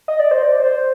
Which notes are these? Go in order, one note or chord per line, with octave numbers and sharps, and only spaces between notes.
D#5
D5
C5
D5
C5